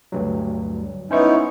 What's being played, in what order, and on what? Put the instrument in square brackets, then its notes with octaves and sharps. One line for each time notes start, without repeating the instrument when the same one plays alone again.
[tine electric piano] D2 G2 F#3
[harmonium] B3 D#4 E4 [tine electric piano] C#4 C5 C#6